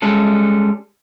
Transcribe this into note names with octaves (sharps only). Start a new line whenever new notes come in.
G3 G#3 C#4 A4